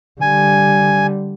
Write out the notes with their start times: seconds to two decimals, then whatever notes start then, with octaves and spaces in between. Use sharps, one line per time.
0.21 D3 G3 G#5